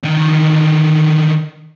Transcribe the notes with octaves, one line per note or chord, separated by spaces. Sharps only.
D3 D#3